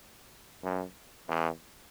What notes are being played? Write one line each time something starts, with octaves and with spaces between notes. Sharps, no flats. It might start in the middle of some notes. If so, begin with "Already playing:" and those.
F#2
E2